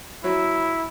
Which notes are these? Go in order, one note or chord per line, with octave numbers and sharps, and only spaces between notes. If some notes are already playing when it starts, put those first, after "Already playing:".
F#3 E4